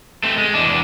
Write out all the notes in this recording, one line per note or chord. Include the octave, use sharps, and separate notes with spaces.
A3 C4
G#3
E2 D4